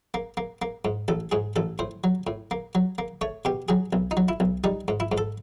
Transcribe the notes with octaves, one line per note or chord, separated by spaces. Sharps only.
A#3
A#3
A#3
G#2
A1 A4
G#2 G#4
A1 A4
A2 C5
F#3
A2
A#3
F#3
A#3
A3 C#5
B2 G4
F#3 G#4
B1
D#4
F#3
E4
B1
G3 D#4
G#2
E4
G#2
A4